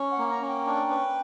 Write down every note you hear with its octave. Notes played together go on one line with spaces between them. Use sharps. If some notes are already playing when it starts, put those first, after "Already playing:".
Already playing: C#4
F#5
A#3
A#5
C#4
G5
D4
B4